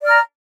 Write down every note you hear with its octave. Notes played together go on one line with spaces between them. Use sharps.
D5 A#5 F6